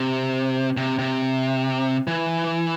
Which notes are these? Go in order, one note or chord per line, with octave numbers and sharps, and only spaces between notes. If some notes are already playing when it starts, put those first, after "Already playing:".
Already playing: C3
C3
C3
E3